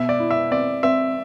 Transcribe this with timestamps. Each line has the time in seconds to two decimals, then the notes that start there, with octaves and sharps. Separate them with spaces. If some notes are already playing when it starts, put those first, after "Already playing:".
Already playing: B2 E5
0.09 D5
0.20 E4
0.31 E5
0.51 C4 D5
0.83 C4 E5